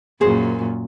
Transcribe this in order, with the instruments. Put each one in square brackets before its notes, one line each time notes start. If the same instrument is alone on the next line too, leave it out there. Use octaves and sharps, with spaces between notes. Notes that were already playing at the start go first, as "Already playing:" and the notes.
[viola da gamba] F#2 A#2 [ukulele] G#4 C5